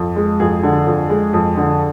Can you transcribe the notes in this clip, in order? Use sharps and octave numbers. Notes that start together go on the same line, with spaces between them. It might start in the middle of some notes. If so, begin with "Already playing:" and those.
Already playing: F2
G#3
F2 G#4
D3
F2
G#3
F2
D3